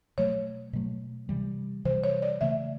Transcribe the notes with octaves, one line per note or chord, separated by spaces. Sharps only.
B2 F#3 A3 C#5
B2 F#3 A3
C3 E3 G3
C3 E3 G3 C5
C#5
D5
C#3 E3 A3 E5